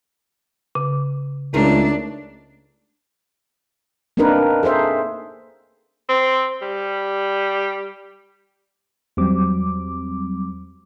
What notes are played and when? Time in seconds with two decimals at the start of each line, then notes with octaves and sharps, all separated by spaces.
0.75 C#3
1.54 C#2 A3 D4 D#4 A#4
4.17 A#3 C4 D4 D#4 A#4 B4
4.63 G#4 A4 C5 E5
6.09 C4
6.62 G3
9.17 E2 F#3 G3 C4 D6